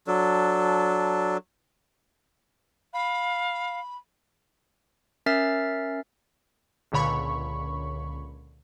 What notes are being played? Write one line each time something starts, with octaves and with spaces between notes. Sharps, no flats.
F#3 D4 A4
F5 B5
C#4 A#4 E5 F6 A6 C7
C#2 A#2 D3 C#5 B5 C#6